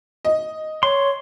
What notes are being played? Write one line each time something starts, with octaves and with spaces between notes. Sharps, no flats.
D#5
C#5 C6